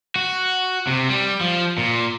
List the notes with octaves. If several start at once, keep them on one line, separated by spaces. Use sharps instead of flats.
F#4
C3
G3
F3
A#2